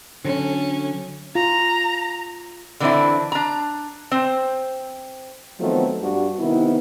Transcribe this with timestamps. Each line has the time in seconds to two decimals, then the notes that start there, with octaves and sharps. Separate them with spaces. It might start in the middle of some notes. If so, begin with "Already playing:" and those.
0.25 D3 F#3 C#4 A4
1.35 F4 A#5
2.80 D3 E3 B3 C4 D4 E4
3.32 D4 A#5
4.11 C4 C5
5.59 D#3 F3 F#3 A3 B3 C4
6.00 G2 F#4
6.39 C3 D#3 B3 E4